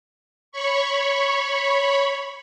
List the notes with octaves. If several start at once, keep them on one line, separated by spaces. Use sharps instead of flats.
C#5 B5 C#6